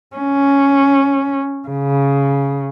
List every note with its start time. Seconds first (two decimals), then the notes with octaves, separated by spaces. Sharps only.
0.17 C#4
1.68 C#3